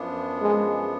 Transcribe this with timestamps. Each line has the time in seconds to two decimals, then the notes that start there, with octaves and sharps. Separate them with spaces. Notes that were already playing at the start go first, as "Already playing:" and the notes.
Already playing: F#2 F3 B3 D4
0.42 G#3